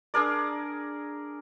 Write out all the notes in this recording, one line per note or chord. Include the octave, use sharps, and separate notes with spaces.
D4 G#4 A#4 D5